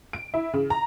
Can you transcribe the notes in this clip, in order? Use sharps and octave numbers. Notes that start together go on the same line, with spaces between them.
D7
E4
C#3
A#5